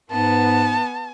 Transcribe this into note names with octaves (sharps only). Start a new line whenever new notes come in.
G#2 B3 A5